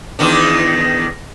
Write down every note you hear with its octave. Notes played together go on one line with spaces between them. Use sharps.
E2 D#3 D4